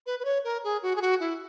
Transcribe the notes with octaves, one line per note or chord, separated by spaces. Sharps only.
B4
B4
C#5
A#4
G#4
F#4
G#4
F#4
E4